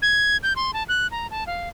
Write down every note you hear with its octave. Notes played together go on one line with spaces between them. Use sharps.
G#6
G6
C6
A5
F#6
A#5
A5
F5